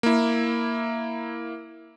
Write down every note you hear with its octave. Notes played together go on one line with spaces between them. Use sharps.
A#3 E4